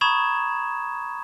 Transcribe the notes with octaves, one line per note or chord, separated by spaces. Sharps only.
A#5 B5 C#6 D#6 G#6 E7